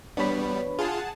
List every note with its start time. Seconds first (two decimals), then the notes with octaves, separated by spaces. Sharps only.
0.17 E2 B2 G3 B3 D4 B4 C#5 B5
0.79 F4 G#4 F#5 A5